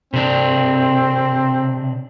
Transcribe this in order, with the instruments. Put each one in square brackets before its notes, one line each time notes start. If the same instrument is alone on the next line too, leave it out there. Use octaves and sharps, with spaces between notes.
[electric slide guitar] C3 D4 [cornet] C4